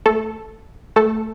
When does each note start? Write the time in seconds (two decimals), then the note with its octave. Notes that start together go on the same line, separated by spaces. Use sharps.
0.06 A3 A4
0.96 A3 A4